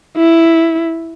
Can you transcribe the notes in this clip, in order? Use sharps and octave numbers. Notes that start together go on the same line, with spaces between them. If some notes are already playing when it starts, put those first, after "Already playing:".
E4